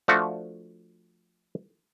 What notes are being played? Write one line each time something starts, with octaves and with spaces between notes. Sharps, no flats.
F3 A3 D4 F#4